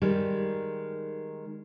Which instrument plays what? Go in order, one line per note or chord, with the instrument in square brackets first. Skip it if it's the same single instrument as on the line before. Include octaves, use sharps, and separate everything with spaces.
[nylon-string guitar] D#3 G3 G#3 G4